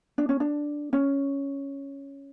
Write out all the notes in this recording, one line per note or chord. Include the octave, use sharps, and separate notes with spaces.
D4
C#4
D4
C#4